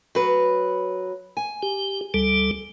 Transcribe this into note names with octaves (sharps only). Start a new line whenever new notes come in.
F#3 B4
G#5
G4
D2 G3 A4